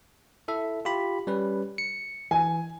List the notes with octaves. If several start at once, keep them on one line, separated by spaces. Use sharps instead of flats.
E4 A4 E5
F4 G4 B5
G3 C#4 B4
C#7
E3 G#5